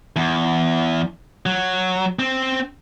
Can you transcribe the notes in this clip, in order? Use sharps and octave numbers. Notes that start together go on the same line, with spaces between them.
E2
F#3
C4